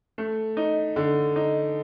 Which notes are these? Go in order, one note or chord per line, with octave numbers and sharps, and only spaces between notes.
A3
D#4
D3
D#4